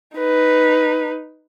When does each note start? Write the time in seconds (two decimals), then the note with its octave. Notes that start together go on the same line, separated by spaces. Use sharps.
0.17 D#4 B4